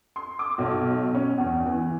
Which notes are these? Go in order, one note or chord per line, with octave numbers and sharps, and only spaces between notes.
C6
D6
B1
C#4
E2
E3